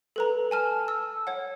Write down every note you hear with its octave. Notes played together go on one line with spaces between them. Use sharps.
A4 B4 A#5
G#5 A5 F6
E6
C#5 F#5